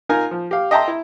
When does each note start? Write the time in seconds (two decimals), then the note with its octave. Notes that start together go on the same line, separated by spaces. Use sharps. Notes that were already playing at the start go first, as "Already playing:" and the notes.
0.09 D#4 F4 A#4 G#5
0.31 F3
0.51 G4 F5
0.71 D#5 E5 G5 A5 A#5 C6
0.88 E4